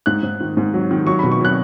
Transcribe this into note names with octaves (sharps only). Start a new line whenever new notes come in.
G#2 F#6
G#2
D#3
G#2
F#3
D#3
F#3 C#6
B2 B5
C#6
F#3 F#6